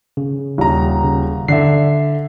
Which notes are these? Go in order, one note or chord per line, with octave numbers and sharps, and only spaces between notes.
C#3
D#1 A#5
C#3
D3 E5 C7